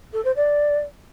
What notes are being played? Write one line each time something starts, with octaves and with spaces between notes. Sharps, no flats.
A4
C5
D5